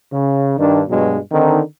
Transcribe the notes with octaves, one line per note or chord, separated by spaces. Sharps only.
C#3
G2 D#3 D4
G2 B2 F#3 G#3
D3 D#3 C4 D#4